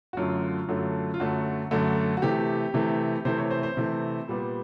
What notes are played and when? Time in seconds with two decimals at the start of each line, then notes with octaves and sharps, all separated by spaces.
0.13 F#4
0.17 F#2 D3 F#3 A3 F4
0.69 F#2 D3 F#3 A3
1.14 F4
1.20 F#2 D3 F#3 A3 F#4
1.71 F#2 D3 F#3 A3
2.17 F#4
2.22 C3 E3 A3 G4
2.74 C3 E3 A3
3.25 C3 E3 A3 C5
3.38 C#5
3.51 C5
3.63 C5
3.77 C3 E3 A3
4.28 A#2 G3 B3